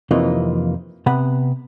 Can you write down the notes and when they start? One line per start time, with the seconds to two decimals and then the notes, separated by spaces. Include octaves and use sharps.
0.11 F2 C3 E3 A#3 D#4 F4
1.06 C3 B3 F#5 B5